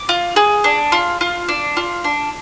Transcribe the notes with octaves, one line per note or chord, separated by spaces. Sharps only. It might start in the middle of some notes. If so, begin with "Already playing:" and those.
Already playing: D6
F4
G#4
D4
F4
F4
D4
F4
D4